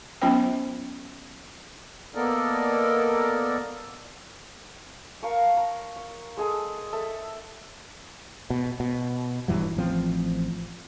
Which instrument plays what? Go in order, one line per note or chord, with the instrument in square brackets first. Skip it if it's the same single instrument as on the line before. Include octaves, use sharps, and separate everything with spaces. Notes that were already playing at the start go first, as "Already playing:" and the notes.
[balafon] F#3 B3 C#4 F4 C5 G5
[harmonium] A#3 B3 A4 A#4 D5 D#5
[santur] A#4 F5 A5 C#6
A#5
C#6
G#3 G#4 A4
A4 E5
[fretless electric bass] B2
B2
D#1 G2 E3 F#3
A1 F3 C4